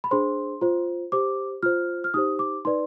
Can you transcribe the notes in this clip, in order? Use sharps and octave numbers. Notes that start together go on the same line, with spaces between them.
B5
D4 G#4 C5 C6
F4 C5
G4 C5 D6
F4 C5 F6
F6
D#4 G4 C5 D#6
D6
D#4 B4 D5 C6